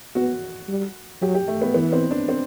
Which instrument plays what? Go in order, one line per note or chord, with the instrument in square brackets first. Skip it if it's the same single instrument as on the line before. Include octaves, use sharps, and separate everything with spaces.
[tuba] B3 [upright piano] F#4
[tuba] G3
[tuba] F#3 [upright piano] G4
[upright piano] G4
A3
B3
[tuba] E3 [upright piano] B3
[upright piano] C4
D4
C4